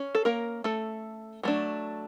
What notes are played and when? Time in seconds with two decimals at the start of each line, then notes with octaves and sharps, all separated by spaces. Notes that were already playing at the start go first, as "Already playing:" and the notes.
Already playing: C#4
0.15 A4
0.25 A#3 A#4
0.64 A3 A4
1.43 F#3 A3 D4